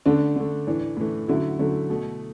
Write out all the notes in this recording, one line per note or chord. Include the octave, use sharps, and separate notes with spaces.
D3 A3 D4
D3 A3
A2 E3 A3 D4
A2 E3 A3
D3 F#3 A3 E4
D3 F#3 A3
B2 A3